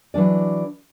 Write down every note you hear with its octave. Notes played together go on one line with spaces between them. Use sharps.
E3 F#3 D4 D5